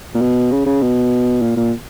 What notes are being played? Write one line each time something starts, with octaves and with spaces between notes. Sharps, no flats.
A#2
B2
C#3
C#3
B2
A#2
A#2